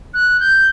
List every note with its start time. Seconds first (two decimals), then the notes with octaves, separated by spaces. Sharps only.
0.14 F#6
0.40 G6